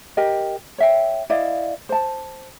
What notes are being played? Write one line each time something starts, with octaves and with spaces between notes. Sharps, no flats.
G4 A#4 D#5
C#5 E5 G5
E4 D5 D#5 F5
C5 A5